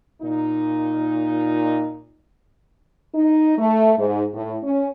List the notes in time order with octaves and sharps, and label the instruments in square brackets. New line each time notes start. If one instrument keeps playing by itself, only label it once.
[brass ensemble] A#2 D#4
[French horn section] D#4
A3
G#2
A2
C#4